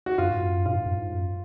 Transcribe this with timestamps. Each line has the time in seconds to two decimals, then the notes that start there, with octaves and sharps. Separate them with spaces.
0.06 F#4
0.18 F#2 F4
0.30 G#2
0.42 F#2
0.66 A#2 F4
0.75 G#2
0.86 F#2
0.95 G#2
1.14 F#2